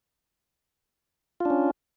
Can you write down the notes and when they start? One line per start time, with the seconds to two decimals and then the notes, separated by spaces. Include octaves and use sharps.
1.40 F4
1.45 D4
1.50 C#4